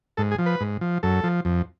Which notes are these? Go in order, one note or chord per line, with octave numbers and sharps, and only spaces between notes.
G#2 A4
G#4
F3
B4
G#2
F3
F#2 A4
F3
F2